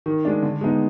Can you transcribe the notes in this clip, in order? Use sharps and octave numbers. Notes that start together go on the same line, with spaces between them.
D#3
G#3 D4
D3
G#3 B3 D#4